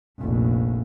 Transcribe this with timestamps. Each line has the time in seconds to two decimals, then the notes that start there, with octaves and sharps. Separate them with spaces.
0.19 F1 A#1